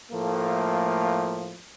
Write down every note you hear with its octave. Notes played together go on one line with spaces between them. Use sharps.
A2 F3 A3 A#3